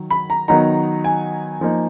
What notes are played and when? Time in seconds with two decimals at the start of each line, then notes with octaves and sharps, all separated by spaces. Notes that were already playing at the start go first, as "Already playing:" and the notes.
Already playing: D#3 F#3
0.11 B5
0.30 A#5
0.48 D#3 F#3 B3 D#4 A#5
1.04 G#5
1.61 F3 A#3 D#4